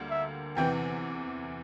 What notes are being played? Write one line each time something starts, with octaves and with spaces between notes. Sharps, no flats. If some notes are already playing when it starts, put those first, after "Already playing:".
Already playing: D2 D3 G3 A#3
E5
E2 C3 E3 G5